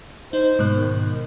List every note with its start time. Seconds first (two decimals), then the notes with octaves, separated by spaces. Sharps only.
0.33 D#4 C5
0.59 G#2 B2 F#6
0.75 D#3